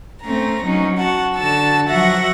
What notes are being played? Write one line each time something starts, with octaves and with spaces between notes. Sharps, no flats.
A3 C4 C#4 A#5
F#3 C#4 D#4
F#4 F#5 A5
D3 F#4 A5 E6
F3 F#3 F#4 E5 F#5 A#6